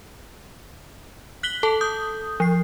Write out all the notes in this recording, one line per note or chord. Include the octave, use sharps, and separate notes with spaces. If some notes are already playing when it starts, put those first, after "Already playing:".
F#6 B6 F#7 G7
A4 A5
D#6 G6
F3 C7